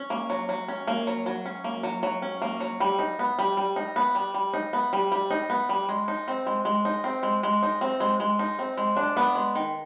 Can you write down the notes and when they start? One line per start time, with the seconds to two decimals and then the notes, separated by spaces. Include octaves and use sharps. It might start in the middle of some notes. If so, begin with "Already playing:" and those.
Already playing: C#4
0.10 A#3
0.30 F#3
0.49 F#3
0.68 C#4
0.87 A#3
1.07 F#3
1.26 F#3
1.45 C#4
1.64 A#3
1.83 F#3
2.03 F#3
2.22 C#4
2.41 A#3
2.60 F#3
2.80 G3
2.99 D#4
3.19 B3
3.38 G3
3.57 G3
3.76 D#4
3.96 B3
4.15 G3
4.34 G3
4.53 D#4
4.73 B3
4.93 G3
5.12 G3
5.30 D#4
5.50 B3
5.69 G3
5.89 G#3
6.08 D#4
6.28 C4
6.46 G#3
6.65 G#3
6.85 D#4
7.04 C4
7.23 G#3
7.43 G#3
7.63 D#4
7.81 C4
8.00 G#3
8.20 G#3
8.39 D#4
8.59 C4
8.77 G#3
8.96 D4
9.17 B3
9.35 G#3
9.55 D#3